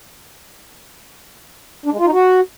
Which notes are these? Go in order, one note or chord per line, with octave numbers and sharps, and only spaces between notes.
D4
G#3
F4
D#4
F#4